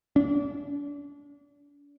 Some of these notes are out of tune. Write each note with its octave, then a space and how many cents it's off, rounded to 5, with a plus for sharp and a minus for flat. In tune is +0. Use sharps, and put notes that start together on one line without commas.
D4 -35